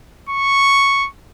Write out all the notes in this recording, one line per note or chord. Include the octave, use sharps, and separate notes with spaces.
C#6